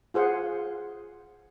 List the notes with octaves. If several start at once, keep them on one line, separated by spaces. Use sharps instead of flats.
F4 G#4 C5 F#5